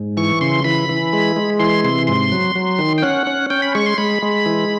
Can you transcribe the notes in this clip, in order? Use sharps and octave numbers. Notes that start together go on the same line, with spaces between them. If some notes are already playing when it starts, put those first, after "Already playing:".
Already playing: G#2
E3 C#6
C#3 C6
E3 B5
E3
G#3
G#3
E3 C6
C3 C6
G#2 C6
F#3
F#3
D#3
G5
C#4 F#5
C#4
C#4 G5
B5
G#3 C#6
C6
G#3 B5
G#3
E3